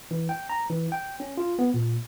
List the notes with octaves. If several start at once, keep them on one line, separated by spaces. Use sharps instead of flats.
E3
G5
A#5
E3
G5
C#4
F4
B3
A#2